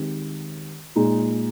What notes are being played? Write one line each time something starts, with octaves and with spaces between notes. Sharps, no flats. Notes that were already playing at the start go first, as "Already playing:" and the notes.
Already playing: D#3 G#3 C4 G4
A#2 G#3 D#4